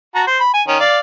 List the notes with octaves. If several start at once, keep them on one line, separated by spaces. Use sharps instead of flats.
F#4 A5 A#5
C5
B5
G#5
D#3 C#4
D5 F5